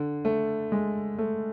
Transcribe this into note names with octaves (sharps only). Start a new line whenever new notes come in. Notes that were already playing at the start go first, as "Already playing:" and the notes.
Already playing: D3
A3
G#3
A3